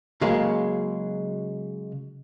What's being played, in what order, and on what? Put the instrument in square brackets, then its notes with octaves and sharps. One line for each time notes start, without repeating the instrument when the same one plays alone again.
[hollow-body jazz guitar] C#3 F#3 G#3 A#3